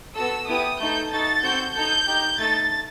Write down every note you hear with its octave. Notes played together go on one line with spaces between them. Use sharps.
B3 F#4 A4 E6
B3 E4 G4 D#6
A3 D#4 A4 G6
D#4 F#4 A4 A6
C4 F#4 A4 G6
D#4 A4 G6
D#4 G4
A3 D#4 A4 A6